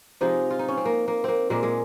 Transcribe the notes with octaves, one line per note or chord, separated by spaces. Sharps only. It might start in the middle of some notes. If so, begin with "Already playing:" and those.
C3 F3 G#3 D#4
F4
D#4
C#4
C4
A#3
A#3
A#3 C4
A#2 G#3 A#3
G#3